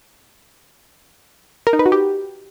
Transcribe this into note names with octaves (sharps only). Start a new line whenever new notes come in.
A#4
D#4
B4
F#4
G4